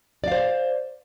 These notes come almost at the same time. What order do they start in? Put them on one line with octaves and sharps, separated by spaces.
D5 F5 C5